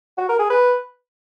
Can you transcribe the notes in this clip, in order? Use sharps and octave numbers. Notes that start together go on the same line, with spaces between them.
F#4
A#4
G#4
B4